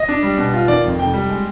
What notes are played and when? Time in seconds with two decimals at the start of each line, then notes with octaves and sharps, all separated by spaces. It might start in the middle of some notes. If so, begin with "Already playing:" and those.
Already playing: D#5
0.09 D4
0.23 G3
0.38 B2
0.53 F4
0.68 D#3 D5
0.84 F2
0.99 F1 G5
1.14 G3
1.30 G#3